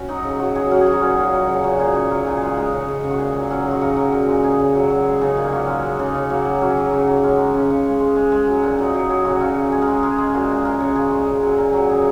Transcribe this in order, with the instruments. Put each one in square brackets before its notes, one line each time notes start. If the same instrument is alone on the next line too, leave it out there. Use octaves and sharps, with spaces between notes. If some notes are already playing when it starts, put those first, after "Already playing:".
Already playing: [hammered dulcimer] C#4 F#4
F#3 D#4
C#3
F#3 F#4
F#3 G#4
F#3 A#4
G#4
F#3
D#4
A#2 C#4
F#3 G#4
F#3
C#3
A#2 F#4
A#2 G#4
C#3 G#4
F#3 A#4
A#2 G#4
G#3 G#4
F#4
G#3 D#4
C#3
C#3
C#3
F#4
A#2 G#4
F#3
F#3 C#4
D#4
C#3
F#4
C#3 A#4
F#3
A#2
G#3
C#3 G#4
C#3
F#3
F#3
G#3 G#4
C#3 D#4
A#2
A#3
F#3 C#4
G#3 C#4
G#3
C#3 D#4
C#3 C#4
F#3 A#3
F#3
F#3 C#4
F#3
C#3
F#3
G#3 C#4
G#3
C#3 C#4
C#3
G#3
G#3
G#3
G#3
F#3
A#2
F#3 D#4
F#3 G#4
F#3 G#4
C#3 F#4
C#3 C#4
C#3
G#3 G#4
A#4
G#3
G#4
G#3 A#4
G#3 G#4
A#2 F#4
G#3 G#4
G#3 A#4
C#3
A#2 G#4
G#3
C#3
F#3
A#2 A#4
F#3
C#3 G#4